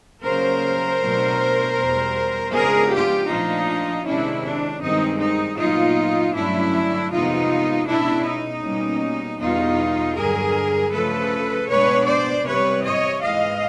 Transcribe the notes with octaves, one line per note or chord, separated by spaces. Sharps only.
C#3 F#3 A#3 A#4 C5
B2 F#3 A3 D4
E2 B2 G3
C#3 F3 G#3 B3 D4 G#4 A#4
F4 G4
A#2 F3 A3 D4 D#4 F4
C3 D#3 G#3 C#4 D4 E4
D4
G2 D#3 G#3 C4 D#4
D#4
A#2 F#3 B3 D#4 F4
G2 D3 F#3 A3 C#4 D4 E4
F2 C3 E3 G#3 B3 D#4 F4
B2 G#3 C#4 D4 E4
D#4
B2 G3 A#3 C#4
E2 B2 G3 B3 D#4 F4
G2 D3 F#3 G#4 A#4
C#3 F3 A3 A4 B4
B2 G#3 B3 D4 B4 C#5
C5 D5
C3 E3 G3 C4 B4 C#5
C#5 D#5
G#2 E3 G#3 D#5 F5